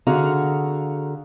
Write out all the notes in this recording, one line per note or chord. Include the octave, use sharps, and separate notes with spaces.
D3 F#4 G#4 F5 A#5